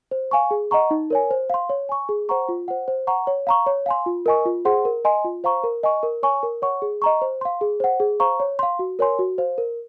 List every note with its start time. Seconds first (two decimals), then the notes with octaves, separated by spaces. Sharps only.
0.11 C5
0.31 F5 G#5 C#6
0.51 G#4
0.71 D#5 F#5 A#5 C#6
0.91 D#4
1.10 A#4 C#5 G#5
1.31 C5
1.50 F5 C6
1.69 C#5
1.89 G#5 C#6
2.09 G#4
2.29 C5 F#5 A#5 C#6
2.49 F4
2.68 C5 F#5
2.88 C5
3.07 F#5 A#5 C#6
3.27 C#5
3.47 F5 A#5 C#6
3.66 C#5
3.86 F5 G#5 C6
4.06 F4
4.26 A#4 D#5 G#5 C#6
4.45 F4
4.65 G#4 C5 F#5 C6
4.85 A#4
5.05 D#5 G#5 C6
5.25 F4
5.44 C5 F5 A#5 C#6
5.64 A#4
5.83 D#5 G#5 C#6
6.03 A#4
6.23 C#5 G#5 C#6
6.43 A#4
6.62 C#5 F#5 C#6
6.82 G#4
7.02 D#5 A#5 C#6
7.22 C5
7.41 F5 C6
7.61 G#4
7.80 C5 F#5
8.00 G#4
8.20 C5 F5 A#5 C#6
8.40 C#5
8.59 F5 C6
8.79 F#4
8.99 A#4 C#5 G#5 C6
9.19 F#4
9.38 C5 F5
9.58 A#4